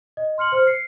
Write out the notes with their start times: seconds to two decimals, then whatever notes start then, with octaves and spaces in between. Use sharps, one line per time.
0.17 D#5
0.38 C6 F6 C#7 F#7
0.52 C5 F6 C#7
0.67 C7 C#7